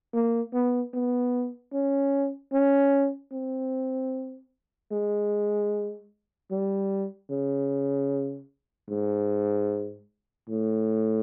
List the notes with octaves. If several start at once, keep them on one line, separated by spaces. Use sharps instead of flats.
A#3
B3
B3
C#4
C#4
C4
G#3
G3
C#3
G#2
A2